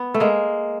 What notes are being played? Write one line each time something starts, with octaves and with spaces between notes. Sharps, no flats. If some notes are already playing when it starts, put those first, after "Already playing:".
Already playing: B3
A3
G#3 A#3